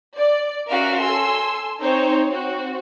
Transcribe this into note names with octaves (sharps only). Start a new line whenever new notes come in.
D5
C#4 F#4 A#4 E5 F5
A4 G#5 C6 E6
C4 D#4 C5 C#5
C4 F#4